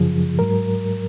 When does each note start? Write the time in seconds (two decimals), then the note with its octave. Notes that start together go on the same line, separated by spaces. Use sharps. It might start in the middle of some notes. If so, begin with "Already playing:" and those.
Already playing: F#2 C#3 F3 G#4
0.39 G#2 F#3 A#4